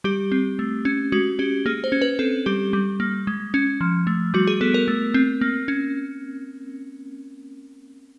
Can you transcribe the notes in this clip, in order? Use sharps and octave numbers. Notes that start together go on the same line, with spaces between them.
G3 G4
C4
A3
C#4
G#3 F#4
C#4 G4
A#3 G#4
C5
C#4
B4
C4 A4
G3 G4
G3
A#3
G#3
C#4
F3
A3
G3 F#4
G#4
B3 A4
A#4
A3
C4
A#3
C#4